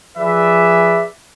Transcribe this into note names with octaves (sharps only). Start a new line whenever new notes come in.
F3 G#4 B4 D5 E5